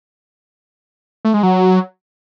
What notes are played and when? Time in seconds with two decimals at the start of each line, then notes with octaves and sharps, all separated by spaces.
1.25 A3
1.34 G#3
1.43 F#3